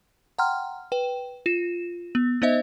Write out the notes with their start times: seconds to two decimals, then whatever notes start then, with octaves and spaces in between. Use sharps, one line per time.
0.38 F#5 G5 A#5 C6 F6
0.92 B4 G5
1.46 F4 E7
2.15 B3
2.42 B3 D#4 C5 D#5 E5